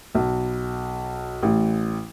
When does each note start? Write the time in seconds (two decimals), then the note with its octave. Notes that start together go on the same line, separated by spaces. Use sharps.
0.15 B1
1.42 A1